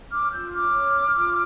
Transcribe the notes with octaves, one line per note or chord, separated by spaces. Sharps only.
C#4 D6 F6
F6
F4 E6 G6
C#4 D6 F6
C#5
C#4
F4